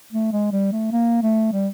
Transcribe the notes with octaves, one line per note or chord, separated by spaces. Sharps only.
A3
G#3
G3
A3
A#3
A3
G3